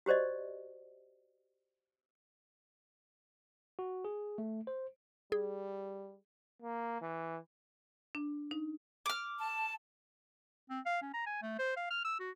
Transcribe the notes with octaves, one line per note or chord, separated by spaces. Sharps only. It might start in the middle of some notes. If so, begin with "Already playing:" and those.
F#4 G4 C5 D5 D#5
F#4
G#4
A3
C5
G3 G#4
A#3
E3
D4
D#4
D6 F6
A5
C4
F5
C#4
A#5
G#5
A3
C5
F5
F6
E6
F#4